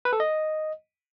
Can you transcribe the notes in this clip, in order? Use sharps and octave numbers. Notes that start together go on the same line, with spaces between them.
B4
A4
D#5